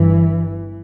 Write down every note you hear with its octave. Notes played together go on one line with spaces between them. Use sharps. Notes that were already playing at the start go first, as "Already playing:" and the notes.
Already playing: G1 G2 E3